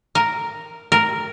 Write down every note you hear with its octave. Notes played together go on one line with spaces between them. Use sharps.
A#4
A#4